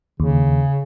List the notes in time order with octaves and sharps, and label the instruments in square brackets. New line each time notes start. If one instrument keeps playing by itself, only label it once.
[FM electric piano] D#2 [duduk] C#3